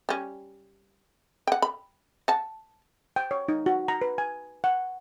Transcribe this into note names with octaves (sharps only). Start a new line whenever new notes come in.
G3 C#4
F#5 G5
B5
F#5 A5
G5
C#5
D#4
F#4
A#5
B4
G#5
F#5